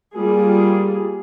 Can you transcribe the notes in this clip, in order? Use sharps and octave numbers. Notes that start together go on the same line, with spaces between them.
G3 A#3 F4 G#4